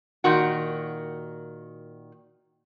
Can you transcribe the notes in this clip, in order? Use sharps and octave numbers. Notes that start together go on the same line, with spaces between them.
A#2 D#3 F#4